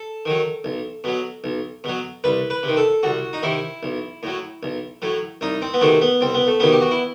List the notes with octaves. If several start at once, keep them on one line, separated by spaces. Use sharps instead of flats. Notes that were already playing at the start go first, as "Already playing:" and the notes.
Already playing: A4
D#3 F#3
B1
B2 F#3
B1
B2 F#3
C2 B4
B4
C3 D#3
A4
C2 F#4
D#4
C3 D#3 E4
B1
A2 F#3
B1
A2 F#3
C2 D#4
C4
B3
C3 D#3 F#3 A3
B3
C2 C4
B3
A3
C3 D#3 F#3 B3
G4
F#4
E4